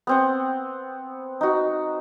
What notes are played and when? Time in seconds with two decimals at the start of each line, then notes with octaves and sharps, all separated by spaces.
0.07 B3 C4 F#5
1.41 D#4 F#4